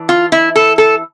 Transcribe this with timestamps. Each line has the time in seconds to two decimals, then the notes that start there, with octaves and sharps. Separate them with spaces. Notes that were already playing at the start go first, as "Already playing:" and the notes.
Already playing: E3 D4
0.09 F4
0.32 E4
0.56 A4
0.78 A4